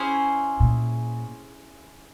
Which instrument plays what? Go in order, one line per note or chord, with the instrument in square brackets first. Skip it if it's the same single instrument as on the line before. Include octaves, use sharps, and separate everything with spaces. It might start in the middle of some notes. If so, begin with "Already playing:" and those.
Already playing: [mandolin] C#4 E4 G#4 C5
[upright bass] A#2